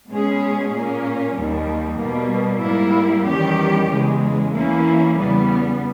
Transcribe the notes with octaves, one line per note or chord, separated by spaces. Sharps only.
B2 G#3 C#4 G#4
A#2 A#3 C#4
D#2 D#3 G3
B2 G3 A#3
G#2 G3 A#3 E4
E2 D#3 G3 C#4 G4
E2 C#3 G#3
E3 A#3 C#4 E4
E2 C#3 G3 B3